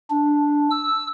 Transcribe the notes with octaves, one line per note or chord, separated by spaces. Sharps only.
D4
E6